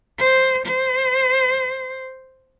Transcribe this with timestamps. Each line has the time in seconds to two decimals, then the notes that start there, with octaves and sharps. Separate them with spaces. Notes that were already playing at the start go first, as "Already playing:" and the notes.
0.19 C5
0.66 C5